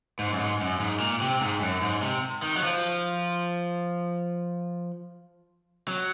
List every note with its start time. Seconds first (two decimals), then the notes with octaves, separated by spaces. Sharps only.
0.19 G#2
0.33 F#2
0.39 G#2
0.60 F#2
0.80 G#2
1.00 A#2
1.21 C3
1.41 G#2
1.61 F#2
1.81 G#2
2.02 C3
2.43 D#3
2.57 F#3
2.63 F3
5.88 F#3